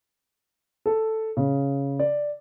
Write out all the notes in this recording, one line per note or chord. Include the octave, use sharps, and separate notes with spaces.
A4
C#3
D5